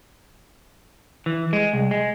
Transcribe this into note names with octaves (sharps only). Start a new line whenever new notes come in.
E3
G#3
C2
G#3